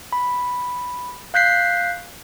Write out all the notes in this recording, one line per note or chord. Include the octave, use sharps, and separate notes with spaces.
B5
F5 F#6 G6 B6 C7